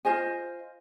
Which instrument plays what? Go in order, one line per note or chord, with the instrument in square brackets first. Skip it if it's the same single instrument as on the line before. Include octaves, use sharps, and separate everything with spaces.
[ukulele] F4 C5 D#5 G#5